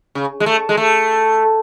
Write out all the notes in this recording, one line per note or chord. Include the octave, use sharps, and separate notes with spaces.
C#3
G#3
A3
G#3
A3